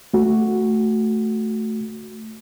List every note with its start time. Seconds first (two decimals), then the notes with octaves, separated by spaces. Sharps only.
0.14 A3 F#4